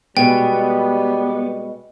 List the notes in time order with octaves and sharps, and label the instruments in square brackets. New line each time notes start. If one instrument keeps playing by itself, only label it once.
[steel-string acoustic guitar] B2 G#3 [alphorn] G3 [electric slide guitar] B3 [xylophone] G5